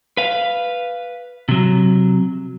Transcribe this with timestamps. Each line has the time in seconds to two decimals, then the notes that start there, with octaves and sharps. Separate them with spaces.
0.17 B4 F5
1.49 C3 F#3